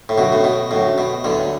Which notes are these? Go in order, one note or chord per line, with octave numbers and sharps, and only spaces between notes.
A2
F#2 B2 D3 A3 F#4
A2
B2
F#2 A2 D3 A3 F#4
B2
D2 A2 D3 F#3 B3